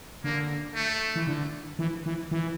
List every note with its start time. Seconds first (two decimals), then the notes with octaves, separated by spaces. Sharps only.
0.24 D3 A#3
0.75 A3
1.16 E3
1.27 D3
1.79 E3
2.06 E3
2.31 E3